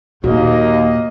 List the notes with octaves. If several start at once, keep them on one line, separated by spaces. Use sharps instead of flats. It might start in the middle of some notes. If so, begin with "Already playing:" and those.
D#2 A#2 A#3 F#4 D#5